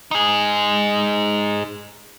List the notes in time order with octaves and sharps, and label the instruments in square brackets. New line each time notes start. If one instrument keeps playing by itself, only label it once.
[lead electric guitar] D#4 G#4